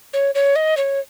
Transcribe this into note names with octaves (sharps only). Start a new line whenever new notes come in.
C#5
C#5
D#5
C#5